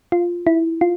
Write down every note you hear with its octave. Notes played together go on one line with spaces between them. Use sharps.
F4
E4
F4